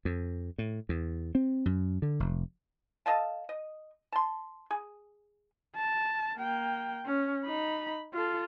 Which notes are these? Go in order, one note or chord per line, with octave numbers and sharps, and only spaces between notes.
F2
A2
E2
C4
F#2
D3
F1
A4 D#5 F5 A5
D#5
A5 C6
G#4
A5
A#3 G5
C#4
D#4 B5
F4 A4